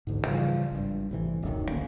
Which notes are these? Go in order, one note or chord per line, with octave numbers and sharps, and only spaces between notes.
A1 D2 G#2
C#3 E3 F3 G3
G#1 G2
A1 C3 E3
D1 B1 F#2 D#3
A1 D2 A#3 C#4